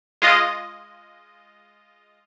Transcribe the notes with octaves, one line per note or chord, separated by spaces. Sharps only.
G#3 F4 D#5